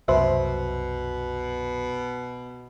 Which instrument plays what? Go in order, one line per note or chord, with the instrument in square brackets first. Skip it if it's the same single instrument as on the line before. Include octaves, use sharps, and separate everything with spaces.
[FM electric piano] C2 F#2 [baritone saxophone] B2 [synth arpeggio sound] C5 E5